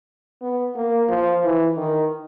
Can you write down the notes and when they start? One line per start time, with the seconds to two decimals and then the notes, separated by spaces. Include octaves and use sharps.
0.42 B3
0.76 A#3
1.09 F3
1.44 E3
1.77 D#3